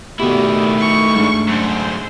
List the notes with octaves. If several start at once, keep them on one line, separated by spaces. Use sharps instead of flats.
B2 D#3 A3 E4 F#4 G4 D5
C#6
G#2 D4
F#2 D3 C5